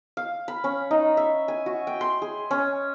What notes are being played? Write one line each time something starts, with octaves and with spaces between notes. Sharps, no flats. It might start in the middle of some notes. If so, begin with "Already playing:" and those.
F5
B5
C#4
D#4
E5
G#5
F#4
G5
C6
G#4
C#4